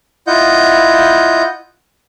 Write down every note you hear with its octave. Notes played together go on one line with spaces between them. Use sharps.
E4 F4 D#5 F#5 G6